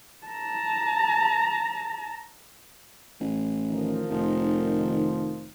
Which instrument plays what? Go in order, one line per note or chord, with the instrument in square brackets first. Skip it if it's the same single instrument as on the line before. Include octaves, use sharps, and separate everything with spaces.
[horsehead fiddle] A5 A#5
[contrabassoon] A1
[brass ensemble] D#3 F3 D#4
[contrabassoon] F1